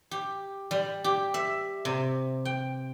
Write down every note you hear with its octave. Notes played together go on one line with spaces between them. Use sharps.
G4
G3
G4
E5
C3
G5